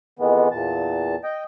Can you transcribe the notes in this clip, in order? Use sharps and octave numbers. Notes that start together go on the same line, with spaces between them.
F2 D#3 E3 G#3 B3
E2 A#2 A5
D#5 G5